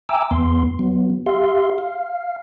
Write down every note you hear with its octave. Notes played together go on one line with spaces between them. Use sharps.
E5 G5 G#5 A#5 D6 E6
E2 B3 C6
F#3 B3
G4 E5 F5 C6
F5